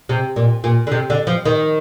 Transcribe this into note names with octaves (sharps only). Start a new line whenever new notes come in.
C3
A#2
A#2
D3
C3
D3
F3
D#3